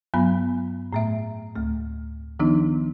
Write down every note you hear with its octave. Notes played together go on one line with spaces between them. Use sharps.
G2 F#3 B3 G#5 B5
A2 A3 E5
D2 A3
D#3 F3 B3 D4 D#4